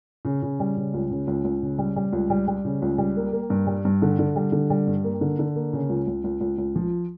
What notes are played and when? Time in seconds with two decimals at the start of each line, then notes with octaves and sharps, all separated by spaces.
0.25 C#3
0.42 C#3
0.60 G3
0.77 C#3
0.94 C#2
1.10 C#3
1.27 C#2
1.44 C#2
1.62 C#3
1.78 G3
1.96 G3
2.13 C#2
2.30 G3
2.48 G3
2.65 C#3
2.82 C#2
2.98 G3
3.17 A#3
3.33 A#3
3.50 G2
3.67 G3
3.85 G2
4.02 D3
4.19 D3
4.36 G3
4.52 D3
4.70 G3
4.87 G2
5.04 A#3
5.21 D3
5.39 D3
5.56 A#3
5.73 C#3
5.90 C#2
6.07 C#2
6.24 C#2
6.41 C#2
6.58 C#2
6.75 F3